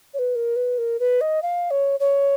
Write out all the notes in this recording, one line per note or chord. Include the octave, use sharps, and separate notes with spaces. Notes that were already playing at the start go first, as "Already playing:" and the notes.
C#5
B4
A#4
B4
A#4
B4
D#5
F5
C#5
C#5